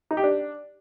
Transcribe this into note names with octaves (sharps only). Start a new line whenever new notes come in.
D#4
G4
D4